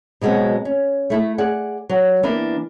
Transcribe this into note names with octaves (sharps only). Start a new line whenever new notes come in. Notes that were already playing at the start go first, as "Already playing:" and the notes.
B2 F#3 G#3 B3 C4
C#4
A3 E4 A4
G#4 D5 F#5
F#3
E3 A#3 B3 D4